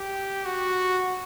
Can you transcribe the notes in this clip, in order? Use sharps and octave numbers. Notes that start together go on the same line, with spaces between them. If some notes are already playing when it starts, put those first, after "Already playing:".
Already playing: G4
F#4